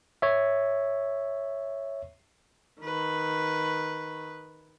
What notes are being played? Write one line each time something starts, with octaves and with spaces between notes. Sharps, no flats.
C#5 E5
D#3 B4